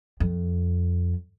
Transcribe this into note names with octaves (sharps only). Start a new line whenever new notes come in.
F2